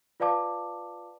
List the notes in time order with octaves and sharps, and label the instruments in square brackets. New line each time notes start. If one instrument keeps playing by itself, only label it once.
[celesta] F4 B4 D5 F5 A5 D6